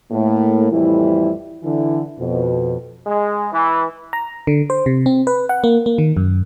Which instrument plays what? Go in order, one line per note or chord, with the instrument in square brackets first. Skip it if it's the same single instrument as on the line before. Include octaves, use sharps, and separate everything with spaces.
[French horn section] A2 A#3
F2 A2 E3 G3 E4
D3 E3 E4
F2 B2
[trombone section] G#3
E3
[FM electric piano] A#5
D3
C5
C3
C4
B4
F#5
A#3
A#3
D#3
F#2